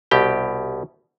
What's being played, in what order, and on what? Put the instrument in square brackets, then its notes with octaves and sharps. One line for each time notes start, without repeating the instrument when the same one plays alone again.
[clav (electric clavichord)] C2 B2 G4 G5